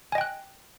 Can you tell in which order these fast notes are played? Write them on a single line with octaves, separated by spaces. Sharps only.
G#5 D#5 G5 F#6